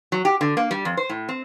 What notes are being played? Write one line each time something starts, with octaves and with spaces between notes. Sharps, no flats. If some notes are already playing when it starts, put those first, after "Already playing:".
F#3
G4
D3
A#3
G3
F2
C5
A2
C4